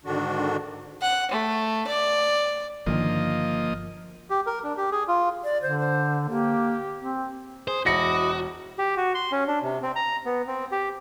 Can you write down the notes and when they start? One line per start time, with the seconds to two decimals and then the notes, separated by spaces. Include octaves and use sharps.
0.05 G#2 D3 D#3 D4 F#4
1.02 F#5
1.32 A3
1.88 D5
2.86 G1 D3 D#3 F3 A#3 D#5
4.30 G4
4.47 A#4
4.64 D4
4.77 G4
4.91 G#4
5.08 F4
5.44 D5
5.62 D3 C5
5.78 C5
6.29 A#3 G4
6.99 C4
7.68 G#4 C5
7.86 E1 E4 F#4 D#5 D6 A#6 C#7
8.79 G4
8.97 F#4
9.15 C6
9.32 C#4
9.47 D4
9.63 C3
9.83 C4
9.96 A#5
10.26 B3
10.47 C4
10.72 G4